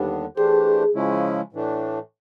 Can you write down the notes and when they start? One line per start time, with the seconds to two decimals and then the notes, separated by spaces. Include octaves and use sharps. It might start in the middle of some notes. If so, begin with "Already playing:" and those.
Already playing: D#2 D3 G3 B3 D4
0.37 E3 A3 D4 G4 G#4 C5
0.95 C#3 F3 G#3 C#4 E4
1.53 A2 E3 A3 D4